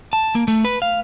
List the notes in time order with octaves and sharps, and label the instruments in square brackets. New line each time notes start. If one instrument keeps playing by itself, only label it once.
[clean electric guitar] A5
A#3
A3
B4
F5